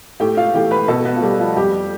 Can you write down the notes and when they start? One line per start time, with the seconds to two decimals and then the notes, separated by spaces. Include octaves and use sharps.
0.20 A2 G4 G5
0.37 F4 F5
0.54 E3 A3 G4 G5
0.71 B4 B5
0.88 B2 A4 A5
1.05 B3 B4
1.16 F4
1.22 G3 A3 G4
1.39 F3 F4
1.56 F2 G3 G4